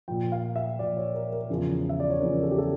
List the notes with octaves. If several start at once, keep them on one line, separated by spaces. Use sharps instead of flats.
A#2 F3 G5
F5
E5
A#2 F3 D5
C#5
A#4
A#4
E2 C#3 F3
E5
D5
C#5
E2 C#3 F3 A#4
A4
G4
A4